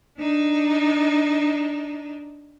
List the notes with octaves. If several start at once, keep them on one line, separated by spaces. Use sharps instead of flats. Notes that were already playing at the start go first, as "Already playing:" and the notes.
D4 D#4